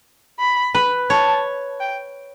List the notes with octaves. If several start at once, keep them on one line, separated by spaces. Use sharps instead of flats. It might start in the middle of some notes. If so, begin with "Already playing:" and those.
B5
B4
C#5 A5
G5